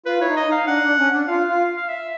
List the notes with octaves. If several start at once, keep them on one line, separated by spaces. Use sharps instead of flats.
F4 B4
E4
C#5
D#4
D#5
D#4 F5
D4 F#5
D4
C#4
D4
F4 F5
F4
F5
E5